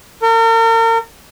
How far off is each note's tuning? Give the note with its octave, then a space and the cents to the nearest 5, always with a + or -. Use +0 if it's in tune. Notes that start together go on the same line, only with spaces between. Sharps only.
A#4 -40